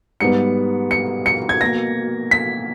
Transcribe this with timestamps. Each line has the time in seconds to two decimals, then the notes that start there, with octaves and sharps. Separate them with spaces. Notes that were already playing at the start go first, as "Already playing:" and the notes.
0.20 G#2 G3 B3 C#7
0.91 C#7
1.26 C#7
1.49 G#6
1.61 B2 A#3 A#6
2.31 B6